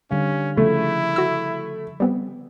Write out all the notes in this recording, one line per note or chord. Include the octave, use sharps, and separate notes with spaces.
D3 G3 C#4 F5
C#3 F3 A3 E4
F#4 E6
G3 B3 C4